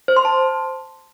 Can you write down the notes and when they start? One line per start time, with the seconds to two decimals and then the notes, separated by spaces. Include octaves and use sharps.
0.08 C5
0.17 C6
0.25 A5